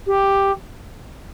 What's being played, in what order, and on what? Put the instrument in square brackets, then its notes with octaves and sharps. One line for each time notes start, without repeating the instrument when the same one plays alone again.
[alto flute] G4